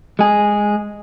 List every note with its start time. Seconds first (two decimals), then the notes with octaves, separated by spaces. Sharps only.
0.19 G#3 G#4